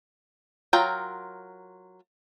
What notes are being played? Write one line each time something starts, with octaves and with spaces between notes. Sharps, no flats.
F#3 F4 A#4 G5